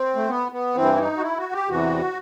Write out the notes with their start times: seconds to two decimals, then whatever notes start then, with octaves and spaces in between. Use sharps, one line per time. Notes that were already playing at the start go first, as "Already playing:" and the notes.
Already playing: C4
0.15 A3
0.28 B3
0.52 B3
0.75 G2 E3 C4
0.94 E4
0.98 D#4
1.17 F#4
1.22 E4
1.37 F#4
1.53 G4
1.68 E2 C3 E3 F#4